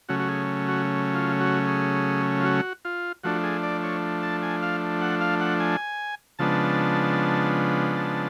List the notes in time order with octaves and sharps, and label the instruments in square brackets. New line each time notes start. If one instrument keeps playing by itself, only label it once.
[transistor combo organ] C#3 F#3 A3 C#4 F#4
F#4
G#4
F#4
F4
F#4
G#4
F4
F#4
F4
F3 A3 D4 F#4
G#4
D5
C#5
A5
G#5
F5
F#5
F5
F#5
G#5
C#3 F3 G#3 B3 D4 A5
A5